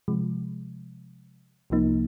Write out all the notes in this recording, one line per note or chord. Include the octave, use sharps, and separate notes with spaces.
C3 F3 G#3
C2 C3 F3 A#3 D#4